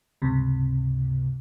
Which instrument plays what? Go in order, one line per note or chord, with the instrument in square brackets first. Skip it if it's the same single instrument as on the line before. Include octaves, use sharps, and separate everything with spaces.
[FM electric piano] C#2 G2 C3